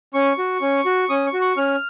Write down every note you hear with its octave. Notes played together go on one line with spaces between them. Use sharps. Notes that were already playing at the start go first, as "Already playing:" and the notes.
C#4 C#6
F#4
C#4
F#4
C#4 D#6
C#6
F#4
C#6
C#4 F6